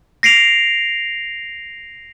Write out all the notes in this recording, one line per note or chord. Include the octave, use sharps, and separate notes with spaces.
A#6 C7 D7 F7